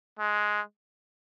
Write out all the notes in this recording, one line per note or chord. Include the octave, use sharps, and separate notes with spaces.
G#3